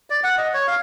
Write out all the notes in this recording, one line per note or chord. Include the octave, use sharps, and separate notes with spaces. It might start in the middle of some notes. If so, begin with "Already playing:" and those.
D5
F#5
D#5
C#5
F5